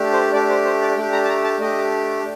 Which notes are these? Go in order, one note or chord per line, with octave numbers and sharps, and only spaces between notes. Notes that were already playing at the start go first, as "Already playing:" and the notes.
Already playing: A3 D4 G4
C5
A3 D4 G4 D5
C5
C5
D5
A3 D4 G4 G5
A#5
A5
A#5
A5
A3 D4 G4 D#5